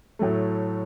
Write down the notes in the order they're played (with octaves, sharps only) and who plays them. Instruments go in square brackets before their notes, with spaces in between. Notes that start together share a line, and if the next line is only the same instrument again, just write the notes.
[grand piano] A2 F#3 A3